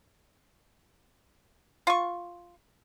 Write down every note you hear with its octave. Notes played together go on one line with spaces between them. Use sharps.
F4 C#6